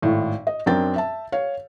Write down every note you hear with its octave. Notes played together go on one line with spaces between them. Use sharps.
G#1 A2
D#5
F#2 C4 D4 A#4 G5 A6
E5 A5
C#5 F5